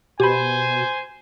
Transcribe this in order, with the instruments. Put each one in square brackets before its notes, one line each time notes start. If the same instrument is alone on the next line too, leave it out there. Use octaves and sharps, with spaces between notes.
[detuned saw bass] B2 [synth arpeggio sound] G4 B5 [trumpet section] C5 G#5